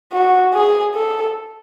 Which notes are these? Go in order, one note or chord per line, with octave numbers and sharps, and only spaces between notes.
F#4
G#4
A4